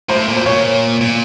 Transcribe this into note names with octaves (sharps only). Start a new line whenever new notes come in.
A2 C5
A#2
C5
A#2 C#5
A#2